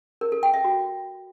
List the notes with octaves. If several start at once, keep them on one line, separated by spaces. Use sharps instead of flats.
A#4
A4
G5
E5
F#4